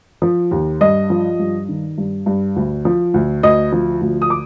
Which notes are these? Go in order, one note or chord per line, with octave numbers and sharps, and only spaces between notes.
F3
D#2
G2 D#5
F3
G2
D#3
G2
G2
D2
F3
D2
D2 D#5
F3
D2
D#6
D6